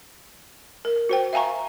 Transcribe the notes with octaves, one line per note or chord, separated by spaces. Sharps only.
A#4
F#4 C5 G5
E5 F5 G#5 A#5 C#6